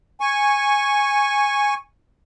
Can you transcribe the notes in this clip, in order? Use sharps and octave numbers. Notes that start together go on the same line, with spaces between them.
G#5 C#6